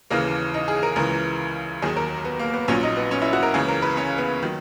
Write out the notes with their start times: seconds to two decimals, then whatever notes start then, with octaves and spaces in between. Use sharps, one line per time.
0.10 D#2 C#3 E3 A#3
0.54 D#4
0.68 G#4
0.83 A#4
0.96 C#2 C#3 E3 A#4
1.82 D#2 D#3 F#3 G#4
1.97 A#4
2.25 B3
2.39 A#3
2.54 B3
2.68 A#1 A#2 F#3 C#4
2.83 D#4
2.97 B3
3.11 C#4
3.22 E4
3.33 F#4
3.43 A#4
3.54 C#2 C#3 E3 G#4
3.68 A#4
3.82 B4
3.97 C#4
4.18 B3
4.42 D#3 F#3